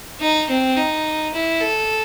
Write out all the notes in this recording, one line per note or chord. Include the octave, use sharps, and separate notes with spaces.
D#4
C4
D#4
E4
A4